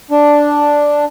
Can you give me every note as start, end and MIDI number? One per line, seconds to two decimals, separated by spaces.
0.11 1.05 62